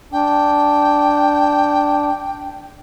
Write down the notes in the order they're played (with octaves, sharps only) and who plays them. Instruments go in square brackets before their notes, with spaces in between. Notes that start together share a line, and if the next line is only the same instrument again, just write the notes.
[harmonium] D4 [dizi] G5